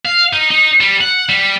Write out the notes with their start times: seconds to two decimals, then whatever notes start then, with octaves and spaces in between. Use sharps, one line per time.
0.05 F5
0.33 D#4
0.50 D#4
0.81 G3
1.01 F#5
1.29 G3